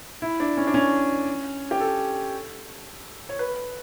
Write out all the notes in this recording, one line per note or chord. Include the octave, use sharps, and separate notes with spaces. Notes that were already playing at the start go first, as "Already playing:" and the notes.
E4
D4
C#4
D4
C#4
G4
A4
C#5
B4